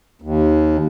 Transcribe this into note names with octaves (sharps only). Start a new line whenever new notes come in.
D#2